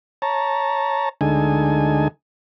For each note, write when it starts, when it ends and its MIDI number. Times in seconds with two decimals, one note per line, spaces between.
0.22 1.09 73
0.22 1.09 81
0.22 1.09 82
1.21 2.08 38
1.21 2.08 50
1.21 2.08 56
1.21 2.08 63
1.21 2.08 69
1.21 2.08 80